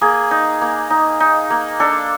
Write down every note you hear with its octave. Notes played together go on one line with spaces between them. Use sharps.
A#3 G#4
D#4
A#3
D#4
D#4
A#3
D4 A4